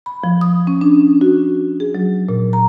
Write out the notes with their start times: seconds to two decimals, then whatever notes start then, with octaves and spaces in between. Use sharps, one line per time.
0.06 B5
0.24 F3
0.41 D#6
0.67 C#4
0.81 D4
1.21 F#4
1.80 G#4
1.95 F#3
2.28 A#2
2.53 A#5